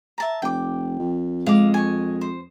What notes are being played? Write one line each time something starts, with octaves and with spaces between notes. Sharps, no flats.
E5 A5 A#5
F1 G5 D6
F2
G#3 F5 D6
G#5 C#6
C5